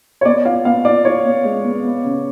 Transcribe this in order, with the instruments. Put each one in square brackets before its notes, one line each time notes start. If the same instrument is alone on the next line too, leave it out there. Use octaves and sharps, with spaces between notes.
[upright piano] C#5
[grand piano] B3 [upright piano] D5
[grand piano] F4 [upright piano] F5
[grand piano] B3 [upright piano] F5
[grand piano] F4 [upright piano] D5
[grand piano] F4 [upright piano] C#5
[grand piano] B3
G#3
B3
B3
C#3